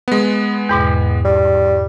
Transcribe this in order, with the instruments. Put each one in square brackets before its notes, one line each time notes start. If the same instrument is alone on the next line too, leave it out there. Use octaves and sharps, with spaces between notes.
[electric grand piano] G#3 B3
[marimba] E2 G#2 B2
[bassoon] G3